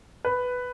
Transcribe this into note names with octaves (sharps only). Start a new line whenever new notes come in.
B4